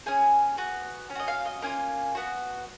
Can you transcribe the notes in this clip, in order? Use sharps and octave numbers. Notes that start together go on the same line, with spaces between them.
C#4 G#4 G#5
B3 F#4
C#4
F#4 D#5
F5
D#5
A#3 C#4 F4 G#5
B3 F#4